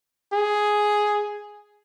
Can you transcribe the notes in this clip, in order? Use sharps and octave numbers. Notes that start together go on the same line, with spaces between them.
G#4